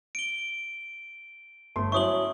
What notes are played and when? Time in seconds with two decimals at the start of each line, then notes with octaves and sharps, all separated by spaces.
0.15 D7 G7
1.76 G1 A3 C6
1.92 F#3 C#4 E4 C#6 D#6 F#7